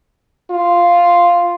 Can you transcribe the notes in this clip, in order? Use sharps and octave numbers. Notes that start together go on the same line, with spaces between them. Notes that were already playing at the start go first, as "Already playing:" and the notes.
F4